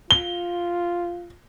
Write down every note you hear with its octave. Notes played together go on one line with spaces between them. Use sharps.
F4 G7